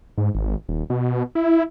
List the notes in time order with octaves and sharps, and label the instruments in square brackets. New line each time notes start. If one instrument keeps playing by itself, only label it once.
[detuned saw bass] G#2
G#1
D#1
B2
E4